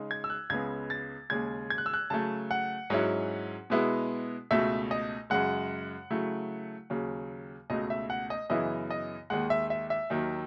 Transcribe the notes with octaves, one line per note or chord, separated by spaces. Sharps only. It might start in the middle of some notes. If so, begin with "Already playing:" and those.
Already playing: C#3 G#3 D#4
G#6
E6
F#6
C#2 C#3 G#3 B3 G#6
A6
D#2 C#3 G#3 G#6
G#6
F#6
E6
F#6
C#3 F#3 A3 A5
F#5
G#2 F#3 C#4 E4
B2 G#3 B3 E4
C#2 B2 A3 E5
D#5
F#2 C#3 G#3 F#5
C#3 F#3 A3 E4
D#2 C#3 F#3
C#2 B2 A3 D#5
E5
F#5
D#5
F#2 C#3 E3 B3 E4 D#5
D#5
D#2 D#3 G#3 F#5
E5
E5
E5
D#2 D#3 F#3